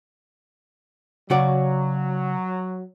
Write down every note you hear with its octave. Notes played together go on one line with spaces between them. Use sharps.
C#3 F#3 F#4 D5